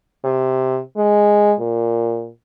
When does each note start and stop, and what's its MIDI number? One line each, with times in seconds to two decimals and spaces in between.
0.24 0.79 48
0.97 1.53 56
1.60 2.29 46